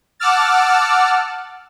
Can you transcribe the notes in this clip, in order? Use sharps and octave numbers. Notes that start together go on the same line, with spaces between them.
F#5 A5 D6 E6 F6 A6